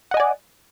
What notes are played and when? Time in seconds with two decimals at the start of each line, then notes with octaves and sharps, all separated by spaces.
0.11 F#5
0.14 D#5
0.17 G#5
0.20 D5